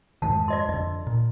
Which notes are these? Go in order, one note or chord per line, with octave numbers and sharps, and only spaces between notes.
F2 G#2 D#3 A5
D5 D#5 C6
F2 D3 D#5
A#2